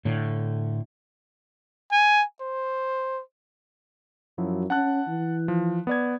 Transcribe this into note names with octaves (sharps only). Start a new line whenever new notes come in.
A2 D3
G#5
C5
F#2 F3 F#3 E4
C#4 F#5 A5 F#6
E3
F3
B3 D5 G#6